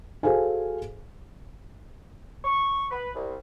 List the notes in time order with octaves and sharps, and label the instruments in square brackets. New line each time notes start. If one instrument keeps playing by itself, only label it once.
[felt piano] F#4 G#4 A4 C5 F5 G#5
[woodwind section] C#6
B4
C2